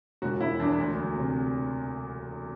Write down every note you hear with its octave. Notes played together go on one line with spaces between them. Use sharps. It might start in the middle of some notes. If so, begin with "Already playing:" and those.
E1 F#4
E1 E4
E2 D4
D2
D2
C3